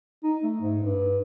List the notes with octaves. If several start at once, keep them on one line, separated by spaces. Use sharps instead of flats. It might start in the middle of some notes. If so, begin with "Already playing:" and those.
D#4
A3
G#2
G2